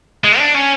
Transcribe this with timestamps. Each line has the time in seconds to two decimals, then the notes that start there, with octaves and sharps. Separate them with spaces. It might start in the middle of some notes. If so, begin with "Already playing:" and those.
0.24 G#3
0.39 D4
0.55 C#4